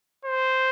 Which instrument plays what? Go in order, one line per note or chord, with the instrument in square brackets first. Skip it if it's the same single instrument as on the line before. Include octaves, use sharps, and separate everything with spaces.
[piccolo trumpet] C5